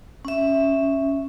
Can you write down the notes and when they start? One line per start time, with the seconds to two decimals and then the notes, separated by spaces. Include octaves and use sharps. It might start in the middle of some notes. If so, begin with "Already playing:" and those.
0.25 C#4 E5